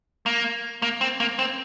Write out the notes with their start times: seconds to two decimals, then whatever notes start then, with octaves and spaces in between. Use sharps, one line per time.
0.26 A#3
0.82 A#3
1.01 C4
1.20 A#3
1.39 C4